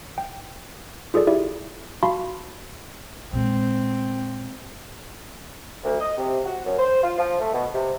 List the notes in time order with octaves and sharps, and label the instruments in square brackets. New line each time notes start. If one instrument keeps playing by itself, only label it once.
[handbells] G5
F4 G#4 A4 D5
E4 G4 D5 E5
F#4 F5 A5 B5 C6
[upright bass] A#2 G#3 [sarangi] C4
[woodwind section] D2
D#5
C3
F#4
F#2
C5
F4
F3
A3
B2
C3